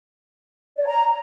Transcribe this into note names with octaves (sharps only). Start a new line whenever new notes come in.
D5
C#5
A#5